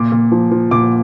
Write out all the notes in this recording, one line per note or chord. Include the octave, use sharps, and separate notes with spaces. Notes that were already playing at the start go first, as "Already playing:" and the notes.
Already playing: A#2 D6
A#2
F3
F3
A#2 D6